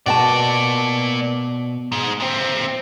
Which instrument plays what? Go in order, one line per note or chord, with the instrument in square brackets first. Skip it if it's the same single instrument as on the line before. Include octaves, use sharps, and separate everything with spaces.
[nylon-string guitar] B2 G5 A5 [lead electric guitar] A#3 D5
[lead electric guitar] G#2 G#3
A#2 C4